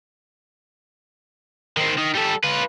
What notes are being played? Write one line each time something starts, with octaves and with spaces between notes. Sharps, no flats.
D#3 C4
D#3
G3 A4
F4 B4